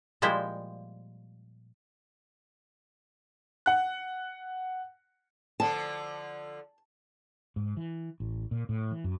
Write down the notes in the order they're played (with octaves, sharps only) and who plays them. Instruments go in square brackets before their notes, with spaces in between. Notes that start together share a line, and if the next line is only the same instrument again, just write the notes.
[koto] A#2 F3 G3 G#3 E4 C5
[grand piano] F#5 F#6
[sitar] D3 F3 [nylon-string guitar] A5
[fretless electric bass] G#2
E3
A1
A#2
A2
E3
F#2